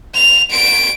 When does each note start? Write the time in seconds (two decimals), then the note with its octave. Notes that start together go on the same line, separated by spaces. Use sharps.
0.15 F7
0.51 D7